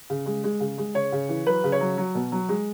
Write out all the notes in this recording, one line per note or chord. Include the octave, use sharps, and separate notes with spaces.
C#3
G#3
G#3
C#3
G#3
C#3 C#5
C#3
E3
F#3 B4
C#3
C#5
F#3
F#3
B2
F#3
G#3